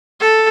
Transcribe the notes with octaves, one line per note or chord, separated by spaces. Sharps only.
A4